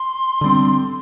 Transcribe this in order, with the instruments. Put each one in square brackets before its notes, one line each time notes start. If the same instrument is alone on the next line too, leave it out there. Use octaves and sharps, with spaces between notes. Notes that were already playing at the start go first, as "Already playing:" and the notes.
Already playing: [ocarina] C6
[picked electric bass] D3 G3 C4